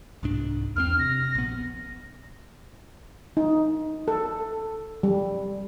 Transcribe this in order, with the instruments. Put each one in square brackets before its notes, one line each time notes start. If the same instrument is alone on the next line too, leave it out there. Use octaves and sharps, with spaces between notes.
[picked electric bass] C2 G#2 D4
[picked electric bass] E2 A3 C4 [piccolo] F6
[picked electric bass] C3 [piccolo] A#6
[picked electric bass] A#1 B3
[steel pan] D#4
A4
G3